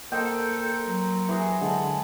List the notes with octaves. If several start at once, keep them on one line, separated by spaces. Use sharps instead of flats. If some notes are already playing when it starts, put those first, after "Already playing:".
A#3 A4 A#4 C5 D#5 G5 E6
F#3
E3 G#4
D3 G#3 F#5 A5